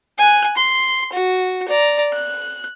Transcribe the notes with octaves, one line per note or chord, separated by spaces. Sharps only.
G#5 F#6
C6
F#4
D5 A#5
F#6